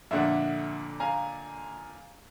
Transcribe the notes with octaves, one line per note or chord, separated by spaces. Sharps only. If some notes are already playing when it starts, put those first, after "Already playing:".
F2 A#2 D3 E5 F#5
F5 G#5 A#5